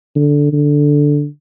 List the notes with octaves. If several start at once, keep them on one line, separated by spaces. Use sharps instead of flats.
D3
D3